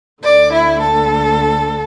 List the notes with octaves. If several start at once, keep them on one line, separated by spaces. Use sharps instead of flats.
D2 D3 D5
E4
A4